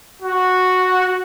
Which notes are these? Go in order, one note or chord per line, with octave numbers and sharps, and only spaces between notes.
F#4